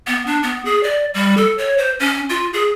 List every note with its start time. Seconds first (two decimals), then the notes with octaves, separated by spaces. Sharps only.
0.07 B3
0.26 D4
0.43 B3
0.65 G#4
0.83 D5
1.14 G3
1.37 A4
1.58 C#5
1.78 C5
2.00 C#4
2.29 F4
2.53 G#4